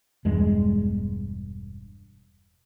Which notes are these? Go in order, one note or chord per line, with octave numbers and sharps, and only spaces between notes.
E1 E2 G2 G#3